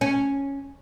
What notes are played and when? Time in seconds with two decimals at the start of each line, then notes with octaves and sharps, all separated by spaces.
0.01 C#4